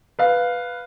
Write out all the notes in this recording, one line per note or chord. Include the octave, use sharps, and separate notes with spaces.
B4 F5